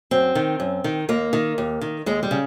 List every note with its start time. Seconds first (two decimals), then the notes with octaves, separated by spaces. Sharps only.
0.11 F#2 C4
0.35 D#3
0.60 F#2
0.84 D#3
1.09 D#2 A#3
1.33 D#3
1.58 D#2
1.82 D#3
2.06 D#2 G#3
2.23 G3
2.31 C#3